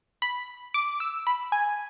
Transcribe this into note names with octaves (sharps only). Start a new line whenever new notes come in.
B5
D6
E6
B5
G#5